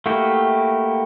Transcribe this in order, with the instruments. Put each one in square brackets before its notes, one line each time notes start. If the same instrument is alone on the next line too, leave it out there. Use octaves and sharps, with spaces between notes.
[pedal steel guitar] A3 A#3 E4 F#4 G4